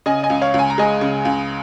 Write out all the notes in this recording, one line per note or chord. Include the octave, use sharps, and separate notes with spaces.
C#3 D#5 G#5
D#5 G#5
C#2
C#5 F5
C#2
G#5
A#5
G#3 D#5 G#5
C#3
C#2